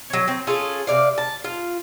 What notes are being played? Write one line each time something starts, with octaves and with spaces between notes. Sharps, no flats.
F#3 C#4
C4
C#4 F4 G#4 A4
C3 D5 F5
A5
F4